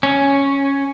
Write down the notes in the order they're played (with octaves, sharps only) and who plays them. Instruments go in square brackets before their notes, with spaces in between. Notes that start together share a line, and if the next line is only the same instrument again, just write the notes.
[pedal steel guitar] C#4